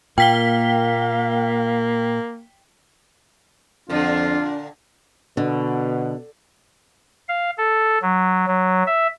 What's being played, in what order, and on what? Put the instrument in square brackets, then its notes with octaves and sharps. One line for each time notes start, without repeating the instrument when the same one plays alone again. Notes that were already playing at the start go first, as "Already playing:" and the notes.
[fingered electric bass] A#2 [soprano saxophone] A#3 [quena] F5 [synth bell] G5 B6 G7
[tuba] F2 [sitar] A#2 D3 [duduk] D4 [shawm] F4
[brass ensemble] B2 [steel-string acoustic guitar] D3
[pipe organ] F5
A4
F#3
F#3
E5